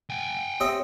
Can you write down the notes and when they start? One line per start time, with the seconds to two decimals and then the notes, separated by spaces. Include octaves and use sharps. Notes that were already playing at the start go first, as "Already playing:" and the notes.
0.10 G5 G#5
0.60 C4 G4 C#5 D#5 E5